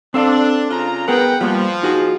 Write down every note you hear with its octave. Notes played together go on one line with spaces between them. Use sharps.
C4 D4 A4 F5
C#3 F4 A#5
B3 G#4 A#4 B4 F#5 G5
F3 G3 A#3
D#4 F#4 G#4